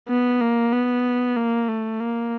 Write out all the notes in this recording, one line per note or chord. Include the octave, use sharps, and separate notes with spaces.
B3
A#3
B3
A#3
A3
A#3